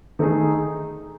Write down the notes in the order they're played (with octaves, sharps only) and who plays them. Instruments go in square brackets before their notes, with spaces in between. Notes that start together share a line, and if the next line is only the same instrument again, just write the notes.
[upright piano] D#3 A3 D#4 G#4